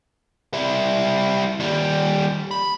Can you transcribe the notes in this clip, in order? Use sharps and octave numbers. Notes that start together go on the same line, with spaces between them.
G3 E4
D#2 G3
B5